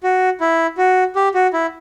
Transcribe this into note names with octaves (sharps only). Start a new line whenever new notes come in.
F#4
E4
F#4
G4
F#4
E4